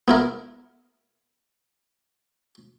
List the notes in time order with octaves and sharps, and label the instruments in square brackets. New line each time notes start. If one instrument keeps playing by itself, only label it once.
[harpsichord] B3 E4 A#4